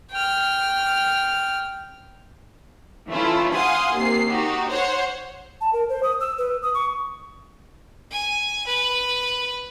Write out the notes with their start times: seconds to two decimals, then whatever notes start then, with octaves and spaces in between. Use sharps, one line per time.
0.12 G5 F6
3.10 E3 A3 C#4 E4 F4
3.54 F5 F#5 G#5 C6 D#6
3.94 D#2 C3 C7
4.27 D#4 F#4 G4
4.70 C5 C#5 F#5
5.61 A5
5.73 A#4
5.89 C5
6.03 D#6
6.20 E6
6.38 B4
6.62 D#6
6.74 C#6
8.11 G#5
8.66 B4